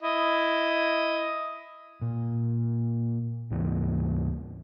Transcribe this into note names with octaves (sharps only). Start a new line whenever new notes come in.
E4 D#5
A#2
D2 G#2 E3 A#3